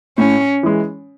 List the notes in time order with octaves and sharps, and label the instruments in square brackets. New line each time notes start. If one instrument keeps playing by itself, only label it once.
[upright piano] A2 [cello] C#4
[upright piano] E3 G#3